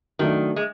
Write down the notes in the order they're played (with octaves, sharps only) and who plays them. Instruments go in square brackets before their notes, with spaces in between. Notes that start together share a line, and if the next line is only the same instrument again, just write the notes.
[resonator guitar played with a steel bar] D#3 [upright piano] F#3 A3 D4
[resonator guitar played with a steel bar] G#3